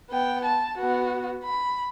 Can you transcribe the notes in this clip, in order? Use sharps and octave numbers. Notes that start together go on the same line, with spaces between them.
B3 G5
A5
B3 F#4
B5